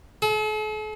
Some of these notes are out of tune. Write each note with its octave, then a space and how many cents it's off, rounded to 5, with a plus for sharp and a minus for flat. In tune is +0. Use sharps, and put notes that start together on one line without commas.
A4 -45